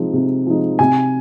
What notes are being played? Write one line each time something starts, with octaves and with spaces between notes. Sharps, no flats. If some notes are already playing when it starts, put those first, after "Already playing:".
Already playing: C3 F3 G#3 D#4
C3
F3 G#3 D#4
C3 G#5